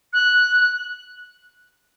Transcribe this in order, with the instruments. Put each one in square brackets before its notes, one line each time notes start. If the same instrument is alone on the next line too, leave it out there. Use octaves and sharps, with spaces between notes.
[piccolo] F#6